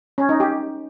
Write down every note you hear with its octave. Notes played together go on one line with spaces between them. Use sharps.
C#4
D#4
G4